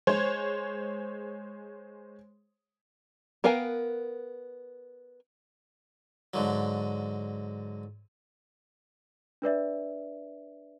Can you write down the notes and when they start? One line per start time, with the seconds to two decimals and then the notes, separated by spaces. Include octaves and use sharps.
0.07 G#3 C5 C#5
3.44 B3 A#4 F5 G5 G#5
6.34 G#2 D3 F#3
9.42 D4 B4 D5 E5